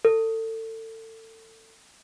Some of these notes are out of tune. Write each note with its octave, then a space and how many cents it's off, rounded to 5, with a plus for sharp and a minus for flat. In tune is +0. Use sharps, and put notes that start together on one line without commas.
A4 +30